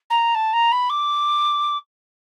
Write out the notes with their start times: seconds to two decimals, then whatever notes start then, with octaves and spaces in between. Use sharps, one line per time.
0.10 A#5
0.35 A5
0.53 A#5
0.72 B5
0.90 D6